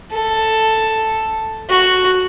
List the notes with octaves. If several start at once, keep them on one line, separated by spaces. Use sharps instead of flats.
A4
F#4